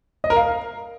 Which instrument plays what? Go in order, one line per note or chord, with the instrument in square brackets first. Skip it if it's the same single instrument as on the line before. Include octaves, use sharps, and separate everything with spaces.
[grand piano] D#5
A#4
F5